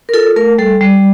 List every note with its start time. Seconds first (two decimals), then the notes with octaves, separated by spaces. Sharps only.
0.09 A#4
0.13 F4 A4
0.36 A3 A#4
0.58 G3 A4
0.81 G3